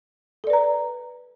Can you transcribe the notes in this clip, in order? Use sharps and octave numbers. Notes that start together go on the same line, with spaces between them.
A4 B4 D5 A#5